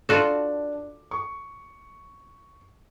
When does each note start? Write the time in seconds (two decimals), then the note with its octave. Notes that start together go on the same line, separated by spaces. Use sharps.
0.09 D4 F4 F#4 A4
1.11 C#6